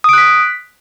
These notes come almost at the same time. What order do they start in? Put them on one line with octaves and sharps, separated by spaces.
D#6 D7 F#6 B6